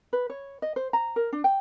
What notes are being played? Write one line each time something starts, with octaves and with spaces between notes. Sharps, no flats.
B4
C#5
D#5
C5
A#5
A#4
D4
G5